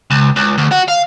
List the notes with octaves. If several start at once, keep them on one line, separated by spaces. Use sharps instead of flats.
C#2
C#2
D2
F#4
F5